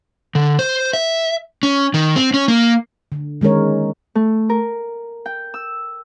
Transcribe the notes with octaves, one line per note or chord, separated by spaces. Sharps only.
D3
C5
E5
C#4
D#3
C4
C#4
A#3
D3
D#3 G#3 C#4 A#4 C#5
A3
A#4
G5
E6